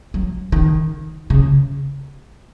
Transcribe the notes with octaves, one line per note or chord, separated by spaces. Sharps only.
F#3
D#3
C#3